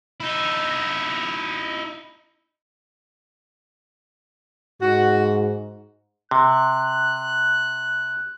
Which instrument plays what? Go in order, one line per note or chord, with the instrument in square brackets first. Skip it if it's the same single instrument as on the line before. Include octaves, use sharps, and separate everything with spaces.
[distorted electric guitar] D#4 E4
[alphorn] G#2 [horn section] F#4
[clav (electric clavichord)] C3 [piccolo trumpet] F#6